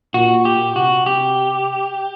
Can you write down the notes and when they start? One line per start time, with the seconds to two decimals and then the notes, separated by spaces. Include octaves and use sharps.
0.14 A#2 F#4
0.45 G4
0.76 C3 F#4
1.06 G4